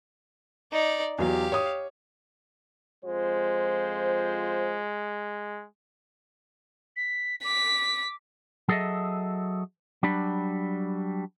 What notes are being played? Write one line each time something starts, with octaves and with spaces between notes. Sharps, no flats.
D#4 D5
E2 F#3 G4 F5
C#5 D#6
F2 G#3 F4 C5
B6
D6 B6
F#3 G#4 A4 C5 D#5 E5
F#3 G3 D4 B5